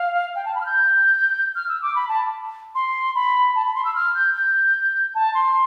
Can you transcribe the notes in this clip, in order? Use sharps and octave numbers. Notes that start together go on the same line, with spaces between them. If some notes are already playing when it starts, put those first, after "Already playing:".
Already playing: F5
G5
A5
B5
F6
G6
F6
E6
D6
B5
A5
C6
B5
A5
B5
C6
E6
F6
G6
G6
A5
C6